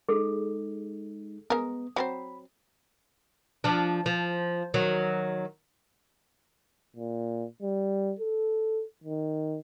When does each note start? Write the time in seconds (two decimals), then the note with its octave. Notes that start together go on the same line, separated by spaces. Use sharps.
0.09 G#3 D#4 G#4 A4
1.50 G#3 B3 A#4 D#6
1.96 F#3 C4 C5 B5
3.64 F3 D4
4.06 F3
4.74 D#3 F#3
6.96 A#2
7.62 G3
8.19 A4
9.04 D#3